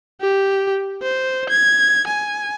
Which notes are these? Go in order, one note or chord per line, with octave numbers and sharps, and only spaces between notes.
G4
C5
G#6
G#5